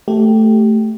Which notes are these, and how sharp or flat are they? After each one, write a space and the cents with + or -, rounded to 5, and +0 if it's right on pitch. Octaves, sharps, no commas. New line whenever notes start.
A3 +0 G4 -10